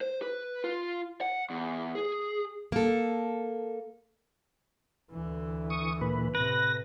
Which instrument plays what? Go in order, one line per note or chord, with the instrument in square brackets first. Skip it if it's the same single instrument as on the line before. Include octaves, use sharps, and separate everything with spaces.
[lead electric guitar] C5
B4
F4
F#5
E2
G#4
[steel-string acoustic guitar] A#3 A4
[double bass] D2 E3
[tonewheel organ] C#6 D#6
A#2 B4
[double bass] A2 C3 [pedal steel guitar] B4 [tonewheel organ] A#6